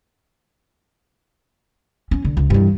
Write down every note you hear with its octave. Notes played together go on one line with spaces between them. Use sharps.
C#4
D3
C#2
G2 E3